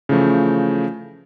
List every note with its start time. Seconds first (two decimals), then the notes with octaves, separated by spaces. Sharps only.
0.09 C#3 E3 F3 A3